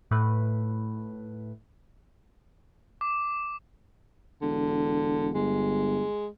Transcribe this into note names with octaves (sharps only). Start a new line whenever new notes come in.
A2 A3 B4
D6
E1 D3
G1 G#3